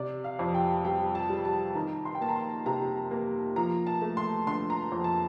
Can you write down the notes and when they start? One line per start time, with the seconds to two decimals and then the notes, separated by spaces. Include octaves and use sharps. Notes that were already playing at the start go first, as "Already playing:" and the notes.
Already playing: C3 D5
0.24 F5
0.39 F2
0.54 G5
0.85 G3 G5
1.15 A5
1.30 G3
1.45 A5
1.75 D#3 A#5
2.05 C6
2.15 G5
2.21 A#3 A5
2.29 A#5
2.36 C6
2.66 C3 A#5
3.11 A#3
3.56 F3 A#5
3.87 A5
4.02 A3
4.17 C6
4.47 D3 C6
4.70 A#5
4.92 F2
5.04 A5